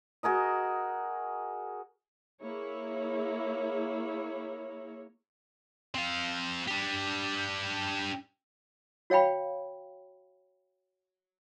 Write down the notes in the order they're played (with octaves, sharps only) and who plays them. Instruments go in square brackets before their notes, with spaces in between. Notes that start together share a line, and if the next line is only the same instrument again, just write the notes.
[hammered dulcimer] F#4 G#4 A#4 D#5
[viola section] A#3 E4 G#4 C#5
[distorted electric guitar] C4 F5
D4 G4
[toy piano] F#4 C#5 F5 G5 B5